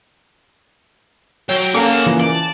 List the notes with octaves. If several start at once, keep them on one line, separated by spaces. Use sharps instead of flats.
F#3 C#5 G5
A#3 C#4 G#4 A4 C#5 F#5
C#3 E3 F3
D5
A5